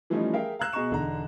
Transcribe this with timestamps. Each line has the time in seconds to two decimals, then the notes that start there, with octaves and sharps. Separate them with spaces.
0.10 E3 F3 G3 A3 C#4 D#4
0.33 G#4 A#4 E5 F5 G5
0.59 F5 A#5 E6 F#6 E7
0.73 B2 G#4 D#5 A#5 C#6 E7
0.91 E1 D3 D#4 A#5